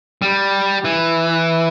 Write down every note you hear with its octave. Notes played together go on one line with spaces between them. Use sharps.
G3
E3